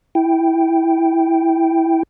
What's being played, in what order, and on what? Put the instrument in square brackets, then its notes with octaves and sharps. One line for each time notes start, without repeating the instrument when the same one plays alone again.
[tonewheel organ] E4 G5